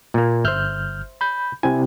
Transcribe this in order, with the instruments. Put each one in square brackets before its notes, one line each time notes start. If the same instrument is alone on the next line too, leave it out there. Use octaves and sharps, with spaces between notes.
[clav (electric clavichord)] A#2 A#3
[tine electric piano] G1 F6 G6 [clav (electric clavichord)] C5 E5
[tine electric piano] B5 G6
[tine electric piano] C3 C4 E4 [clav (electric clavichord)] G#5